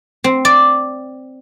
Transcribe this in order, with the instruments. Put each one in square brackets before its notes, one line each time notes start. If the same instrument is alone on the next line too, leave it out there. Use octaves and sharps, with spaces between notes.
[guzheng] C4
D5